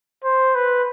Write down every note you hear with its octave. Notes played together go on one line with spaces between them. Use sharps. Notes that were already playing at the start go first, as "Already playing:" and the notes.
C5
B4